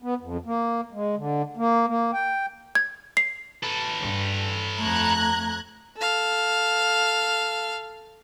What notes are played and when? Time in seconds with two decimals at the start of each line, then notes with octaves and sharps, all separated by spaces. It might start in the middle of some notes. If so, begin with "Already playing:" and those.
0.02 B3
0.21 F2
0.46 A#3
0.93 G#3
1.16 D3
1.57 A#3
1.87 A#3
2.13 G5
2.75 G#6
3.17 C7
3.64 A4 B4
3.99 G2
4.79 F2 A3 A#5 F#6 G#6
5.97 A4 F5